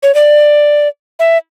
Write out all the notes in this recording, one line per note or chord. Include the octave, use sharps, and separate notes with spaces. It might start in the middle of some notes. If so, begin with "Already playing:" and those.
C#5
D5
E5